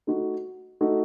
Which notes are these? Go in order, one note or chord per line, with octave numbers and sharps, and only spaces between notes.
A3 D#4 F#4
A3 D#4 F#4